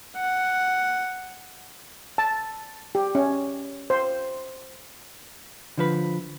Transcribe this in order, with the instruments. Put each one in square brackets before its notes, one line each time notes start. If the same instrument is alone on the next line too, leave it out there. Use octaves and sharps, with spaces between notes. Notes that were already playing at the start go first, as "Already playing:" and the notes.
[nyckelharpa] F#5
[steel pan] A5
G4
C#4
C5
[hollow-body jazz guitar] D3 F3 B4